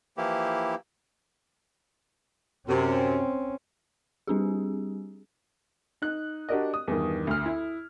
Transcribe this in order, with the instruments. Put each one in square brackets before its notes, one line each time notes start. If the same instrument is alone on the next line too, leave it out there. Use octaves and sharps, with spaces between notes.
[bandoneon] E3 F3 A#3 E4 G4
[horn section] F#2 C3 [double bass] C4 C#4
[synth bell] G3 C4 D4 G4 G#4
[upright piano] D#4 F#6
D4 F#4 G4 A#4 D5 D#5
D#6
E2 G2 D#3
D2 F6
E4